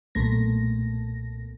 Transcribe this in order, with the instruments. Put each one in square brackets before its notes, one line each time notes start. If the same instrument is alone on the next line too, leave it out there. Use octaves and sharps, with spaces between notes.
[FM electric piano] B1 A#2 A3 A#6